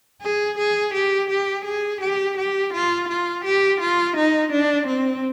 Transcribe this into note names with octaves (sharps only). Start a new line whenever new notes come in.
G#4
G#4
G4
G4
G#4
G4
G4
F4
F4
G4
F4
D#4
D4
C4